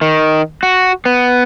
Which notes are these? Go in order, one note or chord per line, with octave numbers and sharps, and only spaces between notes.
D#3
F#4
B3